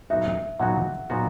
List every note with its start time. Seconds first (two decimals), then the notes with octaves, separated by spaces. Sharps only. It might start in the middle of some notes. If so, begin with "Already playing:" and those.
0.10 A#2 F#3 B3 D#4 F#4 E5
0.60 A#2 F#3 B3 D#4 F#4 F#5
1.10 A#2 F#3 B3 D#4 F#4